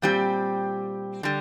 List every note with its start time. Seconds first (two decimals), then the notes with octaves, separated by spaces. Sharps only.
0.02 A#2 G3 C4 G4
1.23 D3 G3